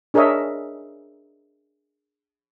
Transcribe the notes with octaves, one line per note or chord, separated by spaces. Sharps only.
D4 G#4 A#4 C#5 D#5 E5